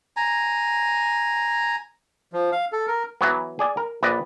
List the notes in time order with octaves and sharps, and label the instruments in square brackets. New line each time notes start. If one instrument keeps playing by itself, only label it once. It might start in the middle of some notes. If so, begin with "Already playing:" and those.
[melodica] G#5 A#5
[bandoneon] F3
F5
A4
A#4
[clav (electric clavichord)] E3 F#3 B3
G#4 D5 G#5
A#4
A#1 B4 D5 D#5